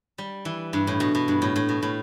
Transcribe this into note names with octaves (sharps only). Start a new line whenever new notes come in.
G3
E3
G2
A2
B2
B2
G2
A2
A2
B2
A2